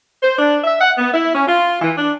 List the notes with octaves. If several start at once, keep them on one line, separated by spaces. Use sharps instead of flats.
C5
D4
E5
F#5
B3
E4
C#4
F4
E3
D4